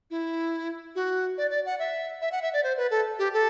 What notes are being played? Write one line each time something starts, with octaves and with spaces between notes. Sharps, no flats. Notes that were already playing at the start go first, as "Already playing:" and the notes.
E4
F#4
D5
D5
F#5
E5
E5
F#5
E5
D5
C5
B4
A4
G4
A4